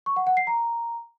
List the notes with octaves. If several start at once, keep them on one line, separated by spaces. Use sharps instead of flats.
C#6
F#5
F#5
C7
A#5